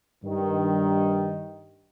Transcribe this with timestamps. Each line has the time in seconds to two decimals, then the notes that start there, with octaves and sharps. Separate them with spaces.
0.24 G2 D#3